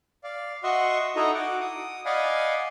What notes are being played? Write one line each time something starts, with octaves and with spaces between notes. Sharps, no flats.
D5 F5
F#4 D#5 E5 F#5 C6 C#6
D#4 E4 F#4 A4 D#5 A#5
F#4 F#5 D6
D#6
D5 D#5 F5 F#5 G#5 B5